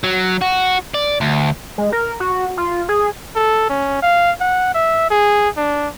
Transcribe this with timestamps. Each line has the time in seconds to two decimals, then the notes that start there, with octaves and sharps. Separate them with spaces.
0.04 F#3
0.42 F#4
0.94 D5
1.21 D2
1.78 G#3
1.92 A#4
2.20 F#4
2.57 F4
2.89 G#4
3.35 A4
3.70 C#4
4.02 F5
4.40 F#5
4.74 E5
5.10 G#4
5.57 D4